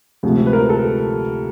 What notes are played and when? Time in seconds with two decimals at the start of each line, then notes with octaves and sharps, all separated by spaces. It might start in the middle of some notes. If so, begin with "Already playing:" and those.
0.23 D2 C3 F3 G#3
0.46 B4
0.53 A#4
0.69 A4